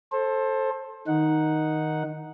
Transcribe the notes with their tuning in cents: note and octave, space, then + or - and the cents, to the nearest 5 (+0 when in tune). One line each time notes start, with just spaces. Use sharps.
A4 +0 C5 +25
D#3 +0 D#4 +0 F#5 -5